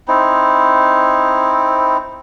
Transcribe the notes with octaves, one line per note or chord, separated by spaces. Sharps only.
C4 D#4 E4